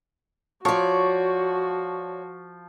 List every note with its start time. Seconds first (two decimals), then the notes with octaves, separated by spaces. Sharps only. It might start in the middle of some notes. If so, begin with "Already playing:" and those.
0.65 F3 F#4 C#5 D5 C#6